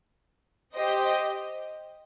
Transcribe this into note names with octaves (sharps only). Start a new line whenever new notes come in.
G4 C5 D#5 G5